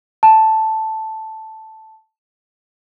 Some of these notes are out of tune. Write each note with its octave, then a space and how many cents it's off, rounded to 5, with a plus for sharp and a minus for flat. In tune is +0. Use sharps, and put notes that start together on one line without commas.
A5 +0